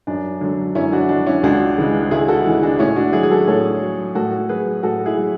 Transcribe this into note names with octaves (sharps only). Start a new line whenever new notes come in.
F#2 D4
D3 F#3
F#2 C#4 E4
D4 F#4
D3 F#3 D4
C#4 E4
C#2 D4 F#4
C#3 E3 G#3
C#2 E4 G#4
F#4 A4
C#3 E3 G#3
D4 F#4
A2 C#4 E4
D4 F#4
F#3 E4 G#4
G#4
F#4 A4
A2 A4 C#5
F#3
A2 F#4 A4
F#3 G#4 B4
A2 F#4 A4
E4 G#4
F#3